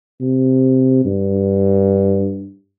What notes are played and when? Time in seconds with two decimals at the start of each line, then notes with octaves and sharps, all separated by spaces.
0.21 C3
1.05 G2